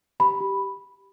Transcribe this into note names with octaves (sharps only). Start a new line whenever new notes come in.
G4 B5
G4